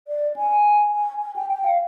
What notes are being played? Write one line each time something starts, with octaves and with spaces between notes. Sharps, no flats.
D5
G#5
G#5
G#5
G5
G5
F5